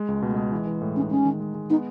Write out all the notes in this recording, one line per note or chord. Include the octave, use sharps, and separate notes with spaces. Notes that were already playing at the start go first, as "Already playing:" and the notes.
Already playing: G#3
C#2
B2 A3
G#3
E3
E3
A2
C#4 D#4
G#3 C#4
D#3
G#3
G#3
B3 D#4